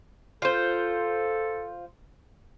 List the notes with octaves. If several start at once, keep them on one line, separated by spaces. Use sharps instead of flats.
F4 A4 C5